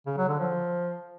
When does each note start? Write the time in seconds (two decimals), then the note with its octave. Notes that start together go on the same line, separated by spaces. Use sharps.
0.06 C#3
0.17 F#3
0.28 D3
0.39 F3